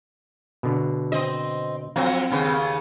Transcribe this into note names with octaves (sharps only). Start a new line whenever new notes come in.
B2 D3
C4 D#5
F2 F#3 C4 F5
D#2 C#3 B3